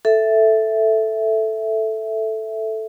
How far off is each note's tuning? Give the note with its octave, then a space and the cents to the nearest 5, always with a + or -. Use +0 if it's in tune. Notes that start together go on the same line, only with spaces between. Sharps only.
A4 +0 E5 +0